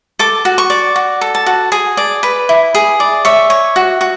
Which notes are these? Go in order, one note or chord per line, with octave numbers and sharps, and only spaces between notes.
A4 D6
F#4
C#6
D5
F#4
A4
A5
F#4
G#4 G#5
D5
B4
E4
G#4
D5
C#5 E5
C#5
F#4
F#4